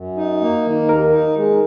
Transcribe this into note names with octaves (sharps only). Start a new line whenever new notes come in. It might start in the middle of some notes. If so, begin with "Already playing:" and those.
Already playing: F#2
D#4
A#3
D#3
D#2 A#4
D#4
G#3